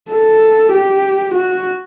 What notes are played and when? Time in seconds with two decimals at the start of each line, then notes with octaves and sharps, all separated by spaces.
0.10 A4
0.72 G4
1.34 F#4